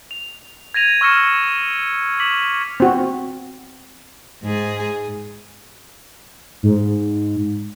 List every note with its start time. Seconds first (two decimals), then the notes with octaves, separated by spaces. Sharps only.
0.11 F7
0.74 G#6 A#6 D#7 F7
1.01 C#6 E6 F6 A#6 C#7 E7
2.20 D6 B6 F#7
2.80 C4 F#4
4.44 G#2 G#4
6.63 G#2